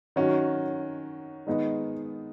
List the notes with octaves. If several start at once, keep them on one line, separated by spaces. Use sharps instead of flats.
D#3 F#3 C#4 F#4
D#3 G#3 B3 D#4